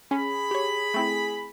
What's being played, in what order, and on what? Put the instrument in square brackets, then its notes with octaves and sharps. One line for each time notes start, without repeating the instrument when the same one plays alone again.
[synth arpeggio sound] C#4 [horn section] G#4 B5
[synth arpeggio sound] G4 C#5
A3 C4 E4